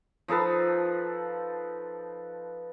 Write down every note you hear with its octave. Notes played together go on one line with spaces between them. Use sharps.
F3 D#4 A4 B4